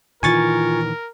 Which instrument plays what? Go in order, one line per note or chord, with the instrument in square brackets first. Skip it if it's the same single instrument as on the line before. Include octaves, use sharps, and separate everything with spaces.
[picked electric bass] A#2 D#3 E3 [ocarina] F4 [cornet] A#4 [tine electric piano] G#5 C#6 A6